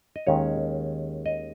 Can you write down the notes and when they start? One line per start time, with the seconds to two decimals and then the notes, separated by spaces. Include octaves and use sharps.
0.16 D#5
0.27 D#2 D#3 G#3 C#4 C#5
1.26 D#5